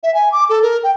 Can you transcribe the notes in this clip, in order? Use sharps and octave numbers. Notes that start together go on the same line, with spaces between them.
E5
G#5
D6
A4
A#4
G5